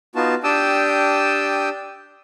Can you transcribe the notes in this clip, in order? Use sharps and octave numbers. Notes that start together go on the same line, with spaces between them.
B3 D#4 F4 F#4 A5
D4 G4 G5 A5 D#6 E6